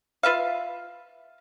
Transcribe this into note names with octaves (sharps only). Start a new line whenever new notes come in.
F4 B4 E5 F5